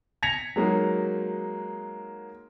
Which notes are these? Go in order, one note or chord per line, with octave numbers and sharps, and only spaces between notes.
G#6 A#6 B6 C#7 F7
F#3 G#3 A#3 D#4 F#4